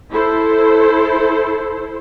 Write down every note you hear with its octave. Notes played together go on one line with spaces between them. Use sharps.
E4 A4 C5